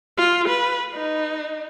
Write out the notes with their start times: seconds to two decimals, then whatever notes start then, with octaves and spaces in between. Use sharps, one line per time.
0.17 F4
0.48 B4
0.94 D#4